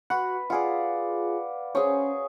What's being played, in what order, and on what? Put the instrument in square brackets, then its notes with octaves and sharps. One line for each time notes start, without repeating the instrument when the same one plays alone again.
[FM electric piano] F#4 F#5 [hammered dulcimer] B4
[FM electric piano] F4 G#4 [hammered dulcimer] D5 F5 F#5
[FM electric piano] C#4 C5 [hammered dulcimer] G#4 C#5